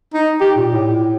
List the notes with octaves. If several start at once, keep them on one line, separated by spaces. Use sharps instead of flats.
D#4
G4
A#2
A2